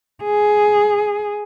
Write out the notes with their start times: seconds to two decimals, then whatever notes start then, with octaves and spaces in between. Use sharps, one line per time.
0.24 G#4